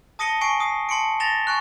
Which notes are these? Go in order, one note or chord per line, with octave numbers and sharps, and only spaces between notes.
A5 D#6 A#6 C#7 D#7 G7
G#5 C#6 C7 D7
D#6 C7
A5 C6 C#7 D7
A6 A#6 E7 F7 G7
G#5 C#6 F#6